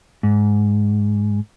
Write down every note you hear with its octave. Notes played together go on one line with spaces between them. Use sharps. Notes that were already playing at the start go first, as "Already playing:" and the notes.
G#2